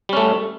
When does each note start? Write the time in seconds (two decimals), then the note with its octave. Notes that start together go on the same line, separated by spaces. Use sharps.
0.09 G3
0.13 C#4
0.17 A3